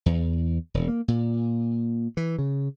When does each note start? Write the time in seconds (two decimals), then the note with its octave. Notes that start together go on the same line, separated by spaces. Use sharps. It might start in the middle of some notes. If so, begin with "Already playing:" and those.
0.06 E2
0.74 E1
0.88 A#3
1.08 A#2
2.17 E3
2.38 C#3